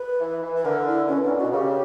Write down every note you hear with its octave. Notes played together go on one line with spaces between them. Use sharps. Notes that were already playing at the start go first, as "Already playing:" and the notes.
Already playing: B4
E3
E3
B4
D3 A#4
E4
B2 C#4
A#2 D4
B2 F#4
C#3 G4 A#4